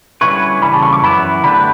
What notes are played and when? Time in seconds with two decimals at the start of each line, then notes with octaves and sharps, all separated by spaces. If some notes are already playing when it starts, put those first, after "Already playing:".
0.21 D3 G3 C#4 E4 B4 C#6
0.62 C#3 E3 G3 B5
0.73 A5
0.82 C#6
0.93 D6
1.03 F#2 E3 B3 E4 B5
1.44 D3 A3 D4 G4 B4 B5